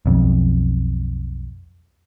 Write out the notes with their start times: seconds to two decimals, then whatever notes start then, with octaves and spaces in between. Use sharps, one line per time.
0.06 B1 F2